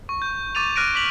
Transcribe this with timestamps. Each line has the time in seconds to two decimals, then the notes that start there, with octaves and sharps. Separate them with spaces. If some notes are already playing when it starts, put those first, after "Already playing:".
0.09 C#6
0.22 G6
0.55 C#6 D6 A6 D#7 F7
0.76 D6 F6 F#6 A#6 D7 D#7
0.95 D6 B6 F7 F#7